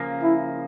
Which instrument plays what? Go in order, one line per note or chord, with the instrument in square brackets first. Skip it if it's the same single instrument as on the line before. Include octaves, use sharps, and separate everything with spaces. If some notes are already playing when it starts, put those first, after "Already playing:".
Already playing: [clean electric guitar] C#3 F3 A#3
[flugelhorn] E4